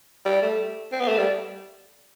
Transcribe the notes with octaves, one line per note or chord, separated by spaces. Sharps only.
G3
A3
C4
B3
A3
G3